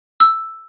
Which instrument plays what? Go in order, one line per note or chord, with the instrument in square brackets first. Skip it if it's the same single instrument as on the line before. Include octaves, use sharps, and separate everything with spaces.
[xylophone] E6